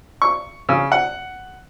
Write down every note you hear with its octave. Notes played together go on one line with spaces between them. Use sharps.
C#6
C#3
F#5